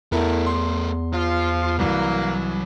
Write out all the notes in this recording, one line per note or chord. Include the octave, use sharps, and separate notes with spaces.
E2 A3 B3 E4 A4 A#4
C6
F3 F4
C2 E3 F#3 A#3